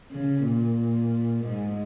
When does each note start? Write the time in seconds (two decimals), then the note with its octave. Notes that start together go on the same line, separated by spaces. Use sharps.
0.11 C#3
0.44 A#2
1.44 G#2